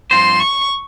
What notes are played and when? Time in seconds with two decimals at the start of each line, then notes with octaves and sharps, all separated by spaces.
0.11 G2 F3 C4 F4 C5 C6
0.40 C#6